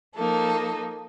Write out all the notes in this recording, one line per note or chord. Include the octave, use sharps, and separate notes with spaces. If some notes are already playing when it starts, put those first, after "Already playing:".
F3 A#3 D#4 A4